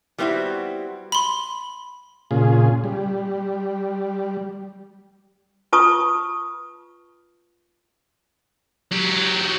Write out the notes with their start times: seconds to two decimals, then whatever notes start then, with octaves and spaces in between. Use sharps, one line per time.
0.18 G3 B3 C4 E4 F#4
1.12 B5 C6
2.31 A#2 C#3 F4 G#4
2.84 G3
5.73 F4 B4 A5 C#6 D#6
8.91 F#3 G4